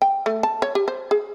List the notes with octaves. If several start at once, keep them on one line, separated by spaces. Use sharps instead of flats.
G5
A3
A5
C#5
G4
C5
G#4